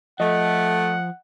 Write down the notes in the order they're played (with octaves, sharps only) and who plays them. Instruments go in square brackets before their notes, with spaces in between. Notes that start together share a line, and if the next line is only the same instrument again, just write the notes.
[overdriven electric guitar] F3 [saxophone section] A3 [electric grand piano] D#5 [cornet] F#5